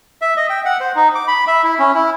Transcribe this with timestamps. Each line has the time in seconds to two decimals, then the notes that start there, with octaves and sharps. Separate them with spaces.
0.22 E5
0.37 D#5
0.50 G5
0.65 F#5
0.80 C5
0.96 D#4
1.15 D6
1.28 B5
1.48 E5
1.63 E4
1.79 C#4
1.94 E4